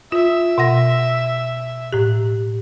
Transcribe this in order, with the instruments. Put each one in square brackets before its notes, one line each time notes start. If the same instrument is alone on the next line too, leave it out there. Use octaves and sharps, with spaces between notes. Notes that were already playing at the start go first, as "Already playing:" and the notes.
[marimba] F4 [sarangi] E5
[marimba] B2 F#5 A#6
A2 G4